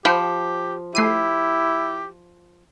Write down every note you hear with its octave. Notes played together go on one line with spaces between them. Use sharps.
F3 G4 C5 G5 B5
A3 E4 G4 C7 D#7